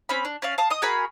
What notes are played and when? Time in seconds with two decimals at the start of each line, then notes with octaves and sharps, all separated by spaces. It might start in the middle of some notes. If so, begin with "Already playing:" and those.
0.09 C4 C#4 B5
0.25 D4
0.42 C#4 D5 F5
0.58 F5 A5 D#6
0.70 D#5 D#6
0.82 F#4 G#4 A#4 B5